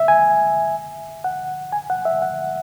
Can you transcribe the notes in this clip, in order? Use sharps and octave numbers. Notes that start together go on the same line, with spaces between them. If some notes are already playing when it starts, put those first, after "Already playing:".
Already playing: E5
G#5
F#5
G#5
F#5
E5
F#5